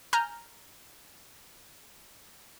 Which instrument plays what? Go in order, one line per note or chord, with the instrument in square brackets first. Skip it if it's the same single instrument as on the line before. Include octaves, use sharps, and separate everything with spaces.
[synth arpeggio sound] G#5 A#5 F6 G6